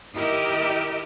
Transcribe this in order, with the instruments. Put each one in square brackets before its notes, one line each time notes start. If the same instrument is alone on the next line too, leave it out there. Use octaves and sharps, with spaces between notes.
[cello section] D#3 E4 G4 A#4 D#5